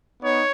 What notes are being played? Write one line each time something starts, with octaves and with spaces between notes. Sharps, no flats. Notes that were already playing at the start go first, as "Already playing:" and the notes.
B3 D#4 C#5